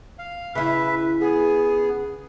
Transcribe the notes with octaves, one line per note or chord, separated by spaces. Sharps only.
F5
C#3 E4 B4 E5
B3 G#4